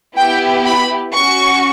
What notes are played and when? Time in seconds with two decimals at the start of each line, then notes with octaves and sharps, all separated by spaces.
0.17 B3 E4 G4 G5
0.66 B5
1.14 C#4 F#4 C#6